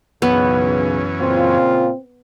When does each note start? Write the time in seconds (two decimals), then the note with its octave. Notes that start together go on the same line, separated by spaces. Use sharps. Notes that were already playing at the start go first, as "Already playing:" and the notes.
0.22 B1 F#2 C#3 E3 B3 C#4
1.20 A#2 C#3 C4 F4